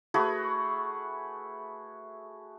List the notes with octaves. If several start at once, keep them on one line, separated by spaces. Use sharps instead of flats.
A3 F#4 G#4 B4